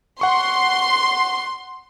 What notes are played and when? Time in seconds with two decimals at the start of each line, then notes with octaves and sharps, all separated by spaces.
0.21 F#5 C6 C#6